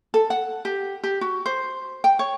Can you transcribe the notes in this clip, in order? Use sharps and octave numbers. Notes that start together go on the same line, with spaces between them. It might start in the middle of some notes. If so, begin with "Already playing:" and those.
A4
F#5
G4
G4
F#4
C5
G5
C#5